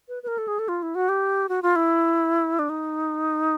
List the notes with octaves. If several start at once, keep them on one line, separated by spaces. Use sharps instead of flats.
B4
B4
A#4
A4
G#4
A4
F4
E4
F#4
G4
F#4
F4
E4
D4
D#4